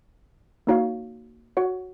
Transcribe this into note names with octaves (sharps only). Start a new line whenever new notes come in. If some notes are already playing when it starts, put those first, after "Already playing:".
A#3 D#4 F#4 C#5 F5
F#4 C#5 F#5